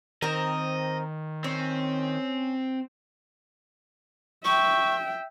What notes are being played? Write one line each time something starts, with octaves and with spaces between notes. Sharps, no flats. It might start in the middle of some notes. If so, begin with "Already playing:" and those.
D#3 C4 A#4 D#5
C4 C#4
E5 G5 C#6